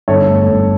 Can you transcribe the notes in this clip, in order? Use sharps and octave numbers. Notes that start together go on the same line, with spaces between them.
G1 A4 C#5
A3
G1